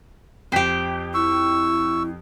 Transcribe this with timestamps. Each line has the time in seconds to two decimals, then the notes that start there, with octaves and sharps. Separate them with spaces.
0.52 F2 G4 C5 G5 B6
1.14 E4 C#6 E6